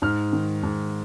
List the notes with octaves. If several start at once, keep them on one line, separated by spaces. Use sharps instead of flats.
G#2 F6
D#3
G#2